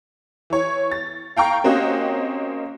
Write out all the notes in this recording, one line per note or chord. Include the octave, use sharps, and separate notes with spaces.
E3 C#5
A6
F5 G5 A#5 C#6
A#3 C4 C#4 F#4 G4 D#5